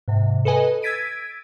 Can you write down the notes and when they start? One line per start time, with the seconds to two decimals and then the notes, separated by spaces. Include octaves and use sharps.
0.08 G#2 C3
0.45 A4 B4 D#5 G#5
0.82 E6 G#6 A6 B6 D7 D#7